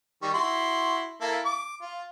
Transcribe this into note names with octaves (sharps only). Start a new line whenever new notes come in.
D#3 G3 C#6
E4 F#4 C6
A#3 E4 A4
D6
F4